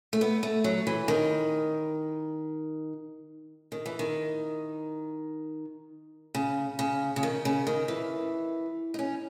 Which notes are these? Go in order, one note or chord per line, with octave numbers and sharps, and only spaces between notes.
A3
B3
A3
F#3
E3
D#3
D#3
E3
D#3
C#3
C#3
C#3
D#3
C#3
D#3
E3
D#4
C#4